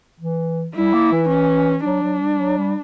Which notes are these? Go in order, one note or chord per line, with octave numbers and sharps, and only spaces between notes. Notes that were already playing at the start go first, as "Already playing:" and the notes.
E3
G3 E4
A#3
E3
C#4
F#3 D4
F#3
G3
F#3
G3